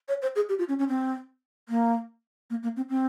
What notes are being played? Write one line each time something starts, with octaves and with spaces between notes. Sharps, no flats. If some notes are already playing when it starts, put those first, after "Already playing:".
C#5
C5
G#4
G4
F4
C#4
C#4
C4
A#3
A#3
A#3
C4
C4